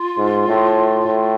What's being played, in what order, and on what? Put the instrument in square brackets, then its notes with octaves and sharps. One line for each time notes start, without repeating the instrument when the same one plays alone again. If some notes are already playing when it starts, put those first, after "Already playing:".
Already playing: [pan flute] F4
[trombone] G#2
A2
A2